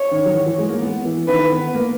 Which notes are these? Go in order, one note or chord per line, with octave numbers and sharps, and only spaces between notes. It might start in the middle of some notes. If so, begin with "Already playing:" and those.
Already playing: C#5
D#3
F#3
E3
E3
G#3
A#3
B3
E3
D#3 B4
B3
A#3